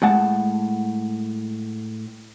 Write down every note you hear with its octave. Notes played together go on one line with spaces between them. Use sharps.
A2 G#3 F#5 A5